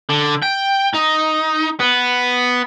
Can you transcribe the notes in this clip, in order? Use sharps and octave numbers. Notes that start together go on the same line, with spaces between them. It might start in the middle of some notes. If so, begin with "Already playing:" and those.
D3
G5
D#4
B3